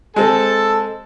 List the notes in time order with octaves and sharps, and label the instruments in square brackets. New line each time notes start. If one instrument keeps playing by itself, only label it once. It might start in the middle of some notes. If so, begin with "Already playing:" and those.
[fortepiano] G#3 C4 [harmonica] A4 A5